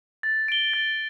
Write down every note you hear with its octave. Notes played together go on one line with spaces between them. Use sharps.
A6
D7 G7
A6